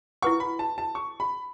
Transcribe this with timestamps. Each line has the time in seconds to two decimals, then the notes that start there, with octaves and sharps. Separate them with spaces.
0.22 E4 B4 F#5 C#6
0.40 B5
0.59 A5
0.78 A5
0.95 C#6
1.20 B5